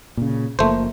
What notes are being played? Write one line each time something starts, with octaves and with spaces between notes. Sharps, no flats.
A#2 C#3
F#1 F3 A3 A#3 C5